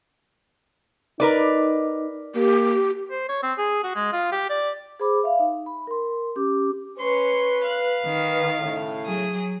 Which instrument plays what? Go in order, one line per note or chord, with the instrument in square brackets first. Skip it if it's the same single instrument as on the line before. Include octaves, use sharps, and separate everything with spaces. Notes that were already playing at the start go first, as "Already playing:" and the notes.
[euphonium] D#4 [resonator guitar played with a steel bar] A#4 B4 D5
[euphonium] A#3 [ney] G4
[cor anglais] C5
C#5
C4
G#4
F#4
G#3
F4
G4
D5
[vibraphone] G#4 C5 B5 D6
E5 F5
D#4
B5
A#4 C6
C#4 G4 D6
[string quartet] C#4 C#6 [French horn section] B4 [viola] C6
[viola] F5 [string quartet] F#6
[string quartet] D#3
[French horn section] A2 C#3
[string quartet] F#3 G#4 D#6